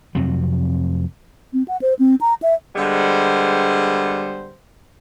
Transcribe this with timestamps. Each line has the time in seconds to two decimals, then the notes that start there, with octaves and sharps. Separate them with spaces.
0.15 F2 C3 F#3
1.53 C4
1.68 F#5
1.82 C5
1.99 C4
2.21 A#5
2.42 E5
2.76 D3 G3 G#3 B3 C5